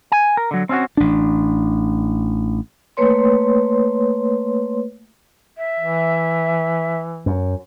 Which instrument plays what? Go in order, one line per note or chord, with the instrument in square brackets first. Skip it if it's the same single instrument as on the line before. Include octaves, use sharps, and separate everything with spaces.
[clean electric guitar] G#5
A#4
D3 F#3
C4 C#4 F4 F#4
[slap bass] A1 D4
[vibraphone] A3 A#3 B4 C#5 C6
[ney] E5
[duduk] E3
[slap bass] F#2